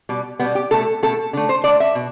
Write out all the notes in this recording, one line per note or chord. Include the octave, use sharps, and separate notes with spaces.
B2 G3
B2 G3 B3
G4
B2 A3 A4
B2 A3 A4
D3 A3
C5
D3 A3 D5
E5
B2